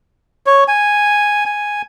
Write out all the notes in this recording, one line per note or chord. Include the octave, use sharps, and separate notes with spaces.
C#5
G#5
G#5